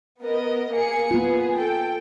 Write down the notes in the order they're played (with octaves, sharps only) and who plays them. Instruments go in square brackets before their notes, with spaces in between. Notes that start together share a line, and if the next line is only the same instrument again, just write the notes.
[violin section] B3 A#4 D#5
A#3 G#4 C#7
[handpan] A#3 F4 [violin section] B3 G#4
[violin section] A4 G5